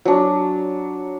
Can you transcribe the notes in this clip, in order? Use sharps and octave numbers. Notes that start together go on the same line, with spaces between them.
F#3 D4